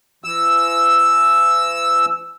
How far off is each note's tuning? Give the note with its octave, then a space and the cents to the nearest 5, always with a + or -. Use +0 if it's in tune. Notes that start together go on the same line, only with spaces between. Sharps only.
E3 +45 E6 +0